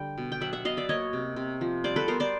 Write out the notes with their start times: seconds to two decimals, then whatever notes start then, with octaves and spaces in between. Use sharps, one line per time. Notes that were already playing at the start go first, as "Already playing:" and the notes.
Already playing: D3 G3 G5
0.18 B2
0.32 G5
0.41 F#3 E5 F#5
0.53 E5 F#5
0.65 B2 D#5 F5
0.77 D5 E5
0.89 A#3 C#5 D#5
1.13 C3
1.36 C3
1.61 F3
1.84 G3 C5 D5
1.96 A4 B4
2.08 B3 A#4 C5
2.20 C5 D5